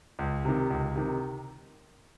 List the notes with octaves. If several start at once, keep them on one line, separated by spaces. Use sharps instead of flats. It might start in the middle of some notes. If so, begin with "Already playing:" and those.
C#2
C3 D#3
C#2
C3 D#3